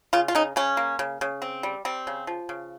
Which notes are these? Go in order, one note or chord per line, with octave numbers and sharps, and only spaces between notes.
C#3 F4
F4
C#3 D#4
C#3 C#4
A#3
C#3
C#3
C4
G3
G3 C4
C#3
F3
C#3